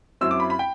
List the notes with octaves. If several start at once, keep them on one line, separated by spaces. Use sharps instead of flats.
F#2 F#3 C4 E4 E6
D6
B5
B5
G5